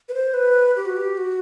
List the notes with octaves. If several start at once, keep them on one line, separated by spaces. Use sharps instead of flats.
B4
C5
B4
G4
F#4
G4
F#4